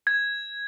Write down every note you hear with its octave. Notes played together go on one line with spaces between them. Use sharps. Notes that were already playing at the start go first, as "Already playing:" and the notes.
G#6